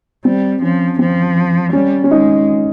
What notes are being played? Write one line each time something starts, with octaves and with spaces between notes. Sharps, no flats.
G3 C4
F3 C#4
F3 C4
G3 C#4
C#4
G#3 D#4